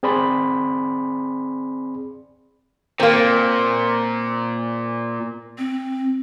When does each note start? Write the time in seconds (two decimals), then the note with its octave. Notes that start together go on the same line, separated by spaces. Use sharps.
0.03 C4 G#4 D5 B5 C6
3.00 A#2 A#3 C4
5.58 C4